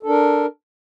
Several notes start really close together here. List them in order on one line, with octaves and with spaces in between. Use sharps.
A4 D4 A#4